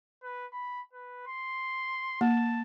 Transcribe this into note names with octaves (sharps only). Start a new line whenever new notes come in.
B4
B5
B4
C6
A#3 A5